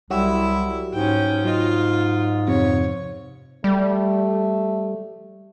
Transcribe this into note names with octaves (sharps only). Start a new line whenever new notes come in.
C2 F#3 E4 F#4 G4 E5
G#2 C#4 G5
F#3 F4 D#5
F2 C3 C#5
G3 A3